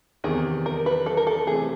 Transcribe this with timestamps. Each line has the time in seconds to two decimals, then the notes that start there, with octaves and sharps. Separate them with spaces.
0.24 E2 C3 D#3 G#4
0.66 A#4
0.86 B4
1.06 A4
1.17 A#4
1.27 A4
1.47 C3 E3 A3 G#4